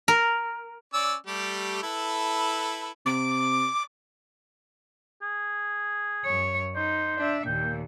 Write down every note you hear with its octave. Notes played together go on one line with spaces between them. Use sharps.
A#4
C#4 D5 E6
G3 A3 G4
E4 A4 B4
C3 D6
G#4
F#2 C#5
D#4 C5
D4 E5
D#2 A#2 G5